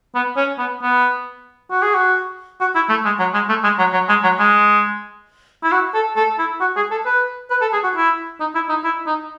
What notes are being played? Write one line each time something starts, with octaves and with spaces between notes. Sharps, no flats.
B3
C#4
B3
B3
F#4
G#4
F#4
F#4
E4
A3
G#3
F#3
G#3
A3
G#3
F#3
F#3
G#3
F#3
G#3
E4
F#4
A4
A4
E4
F#4
G#4
A4
B4
B4
A4
G#4
F#4
E4
D#4
E4
D#4
E4
D#4